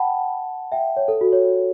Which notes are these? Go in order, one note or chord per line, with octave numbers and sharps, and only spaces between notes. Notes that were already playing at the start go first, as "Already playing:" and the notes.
Already playing: F#5 G5 A5 B5
E5 G5
C#5
A4
F#4
C#5